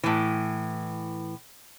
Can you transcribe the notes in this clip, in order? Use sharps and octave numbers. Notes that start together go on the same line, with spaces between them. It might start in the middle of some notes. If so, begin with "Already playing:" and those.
A2 E3